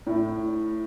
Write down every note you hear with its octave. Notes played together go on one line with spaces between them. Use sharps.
A2